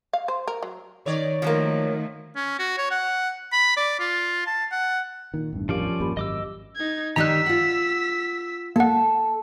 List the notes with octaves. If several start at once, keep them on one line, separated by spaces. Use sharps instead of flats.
F5
C5
A#4
F#3
D#3 C#5 D5
D#3 F3 F#3 A3 A#3
C#4
F#4
C#5
F#5
B5
D5
F4
A5
F#5
A#2 D#3
A1 E2 G2
F3 C#4 G4 A#4 D5 F5
G#1 F2 A#3 G4 B5
G#1 F#2 D#5 D6 E6
D#4 G#6
D#3 G3 D#4 A#5 E6 F#6 B6
F4 F#5
A#3 A4 F#5